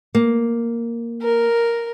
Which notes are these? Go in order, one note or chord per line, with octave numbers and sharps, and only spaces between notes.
A#3
A#4